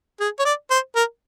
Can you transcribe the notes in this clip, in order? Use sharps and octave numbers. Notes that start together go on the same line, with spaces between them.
G#4
C#5
D5
C5
A#4